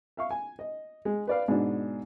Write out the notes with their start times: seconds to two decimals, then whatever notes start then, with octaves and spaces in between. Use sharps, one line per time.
0.17 E5 F5 C#6
0.31 G#5
0.59 D#5
1.05 G#3
1.27 B4 D5 F5
1.48 G#2 B2 D4